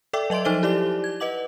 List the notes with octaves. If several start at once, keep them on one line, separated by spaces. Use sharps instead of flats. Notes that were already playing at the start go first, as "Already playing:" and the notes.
A4 D5 E5 G5 D6 E6
F#3 D#5 E5 C6 D7
F3 D#4 A4 C5 A6 G7
E4 G4 D5 D6 G7
G#6
B4 D#5 F#5 D6 F#7